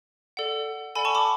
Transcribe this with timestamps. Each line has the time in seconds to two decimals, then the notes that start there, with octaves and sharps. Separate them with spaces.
0.37 A4 D5 F#5
0.95 A4 D5 F#5 G#5 B5
1.05 A5 C#6
1.15 B5 D6